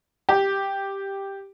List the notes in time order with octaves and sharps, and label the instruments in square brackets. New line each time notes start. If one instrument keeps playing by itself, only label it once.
[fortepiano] G4